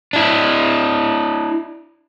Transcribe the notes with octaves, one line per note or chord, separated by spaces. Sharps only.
D4 E4